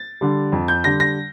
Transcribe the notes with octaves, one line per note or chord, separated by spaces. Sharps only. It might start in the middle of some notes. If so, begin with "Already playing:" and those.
Already playing: A6
D3 G3
F2
G6
D3 G3 A#6
A#6